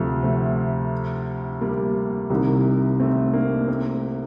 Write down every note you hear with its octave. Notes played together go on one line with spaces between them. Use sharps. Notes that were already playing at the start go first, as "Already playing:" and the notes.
Already playing: D2 C3 F3
A3 C4
G3 A#3
C2 C3 D#3
A3 C4
A#3 D4
A3 C4